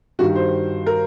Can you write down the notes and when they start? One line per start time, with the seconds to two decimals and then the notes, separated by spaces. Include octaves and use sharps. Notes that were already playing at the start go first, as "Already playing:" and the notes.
0.19 G2 D#3 G3 F#4
0.35 C5
0.86 A#4